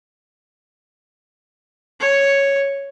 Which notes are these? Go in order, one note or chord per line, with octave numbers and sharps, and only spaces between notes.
C#5